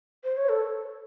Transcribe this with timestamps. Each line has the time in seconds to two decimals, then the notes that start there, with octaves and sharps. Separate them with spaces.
0.24 C5
0.37 C#5
0.49 A4